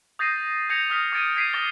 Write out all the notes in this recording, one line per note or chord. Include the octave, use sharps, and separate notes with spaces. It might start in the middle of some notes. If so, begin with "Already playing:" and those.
D#6 G6 A6 A#6 C7 D#7
G6 G#6 A#6 C#7 F7
D#6 F6 B6
D6 G#6 A6 D7 D#7
G#6 B6 C7 D7 D#7
D6 D#6 A6 A#6 G7